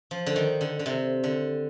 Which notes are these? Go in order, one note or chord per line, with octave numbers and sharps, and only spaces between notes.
F3
D3
D#3
D3
D3
C3
D3